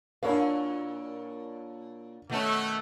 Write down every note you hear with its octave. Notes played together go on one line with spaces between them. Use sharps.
A#2 D4 E4 A#4 C#5 F5
B2 D#3 A3 B3 C#4